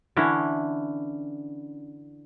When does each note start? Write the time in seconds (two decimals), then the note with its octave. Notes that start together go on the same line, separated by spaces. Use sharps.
0.16 D3 E3 C#4 D4